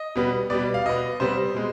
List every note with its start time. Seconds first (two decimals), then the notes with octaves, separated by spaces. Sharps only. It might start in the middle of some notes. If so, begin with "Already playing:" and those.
Already playing: D#5
0.15 B2 G3 B3
0.50 B2 G3 B3 D5
0.74 F5
0.86 B2 B3 D#5
1.20 C3 G3 B3 C5
1.54 B2 G#3